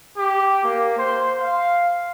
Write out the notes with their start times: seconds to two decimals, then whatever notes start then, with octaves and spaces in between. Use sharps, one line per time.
0.17 G4
0.64 A#3
0.98 C5
1.39 F5